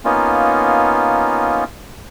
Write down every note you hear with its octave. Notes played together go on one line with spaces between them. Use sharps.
A#3 B3 C#4 D#4 F4